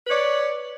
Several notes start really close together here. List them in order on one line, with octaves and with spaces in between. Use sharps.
B4 C#5 D5